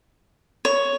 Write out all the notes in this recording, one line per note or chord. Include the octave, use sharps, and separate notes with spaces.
C#5